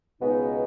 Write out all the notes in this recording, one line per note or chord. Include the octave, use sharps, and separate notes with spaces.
C#2 B2 G#3 B3 D#4